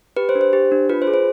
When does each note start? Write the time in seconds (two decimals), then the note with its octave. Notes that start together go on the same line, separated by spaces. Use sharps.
0.17 G4 B4
0.29 C5
0.35 D4
0.41 C5
0.53 G4
0.72 D4
0.90 F4 B4
1.02 C5
1.07 G#4
1.14 C5